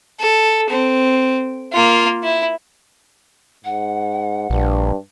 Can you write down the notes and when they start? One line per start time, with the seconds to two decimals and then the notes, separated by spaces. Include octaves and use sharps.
0.20 A4
0.69 C4
1.73 A#3 F4
2.23 E4
3.65 G#2 F#5
4.50 A#1 G2